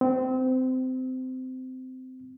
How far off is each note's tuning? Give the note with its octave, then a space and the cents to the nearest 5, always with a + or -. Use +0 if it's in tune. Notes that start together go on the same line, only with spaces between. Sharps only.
C4 -25